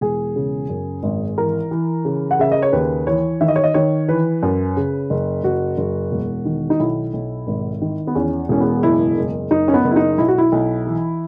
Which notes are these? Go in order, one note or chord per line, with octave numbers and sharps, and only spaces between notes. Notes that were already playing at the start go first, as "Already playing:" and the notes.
E1 G#4
C#3
F#2
G#1
E3 A#4
E3
C#3
F#5
C#3 E5
D#5
C#5
D#2 B4
E3 C#5
D#3 E5
D#5
C#5
D#5
D#3 C#5
E3 B4
F#2
C#3
F#1
F#1 F#4
F#1
E1
D#3
D#4
B1 E4
B1
G#1
D#3
B3
E2 C#4
E1 C#4
B3
F#1 E4
F#1
F#1 D#4
C#4
B3
F#1
E4
D#4
B1 E4
F#4
E4
B1
E3